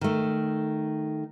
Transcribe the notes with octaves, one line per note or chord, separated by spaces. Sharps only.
D#3 A3